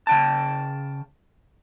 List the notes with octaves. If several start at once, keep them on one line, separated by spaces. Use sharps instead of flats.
C#3 G5 A5